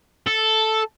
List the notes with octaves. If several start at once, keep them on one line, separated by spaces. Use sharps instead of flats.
A4